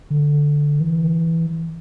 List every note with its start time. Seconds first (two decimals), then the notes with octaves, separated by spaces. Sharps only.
0.10 D3
0.80 E3